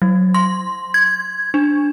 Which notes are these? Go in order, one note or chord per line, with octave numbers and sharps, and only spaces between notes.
F#3
C6
G#6
D4